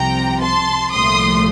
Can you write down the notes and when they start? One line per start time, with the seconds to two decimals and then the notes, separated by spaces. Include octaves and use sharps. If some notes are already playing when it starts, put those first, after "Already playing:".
Already playing: C2 C3 F3 G5 A#5
0.41 A5 C6
0.93 C2 A#2 F3 A3 C6 D#6